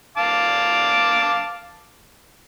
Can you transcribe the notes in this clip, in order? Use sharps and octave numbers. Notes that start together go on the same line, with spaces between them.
F5 A5 D6